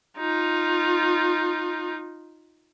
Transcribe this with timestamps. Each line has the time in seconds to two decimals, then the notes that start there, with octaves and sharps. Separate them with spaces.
0.18 D#4 F4